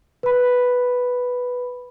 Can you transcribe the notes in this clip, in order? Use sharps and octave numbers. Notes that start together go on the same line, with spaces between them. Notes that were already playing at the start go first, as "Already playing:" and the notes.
B4 B5